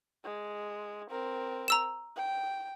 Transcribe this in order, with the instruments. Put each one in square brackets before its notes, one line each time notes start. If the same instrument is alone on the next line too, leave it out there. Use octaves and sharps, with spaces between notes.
[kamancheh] G#3
C4 A#4
[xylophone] A#5 E6 E7
[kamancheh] G5